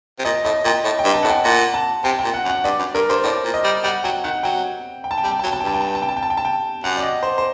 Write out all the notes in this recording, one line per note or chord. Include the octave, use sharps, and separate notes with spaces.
C3
A#2 D#5
A2 D#5
A#2 G5
A2
G5
G2
A5
A2 F#5
G5
A#2 F#5
A5
C3 G5
G5
A#2
F#5
F#2
F#5
G2 D5
F#2
G2 A#4
G2 C5
A2 D5
A#2
D#5
G3
G3 F#5
F#3 G5
D#3 F#5
F#3 G5
G5
A5
G5
G3 A5
G5
A5
F#3
G5
A5
G5
G2 A5
G5
A5
G5
A5
G5
A5
G5
A5
G5
A5
G5
F#2 F#5
D5
D#5
C5
C5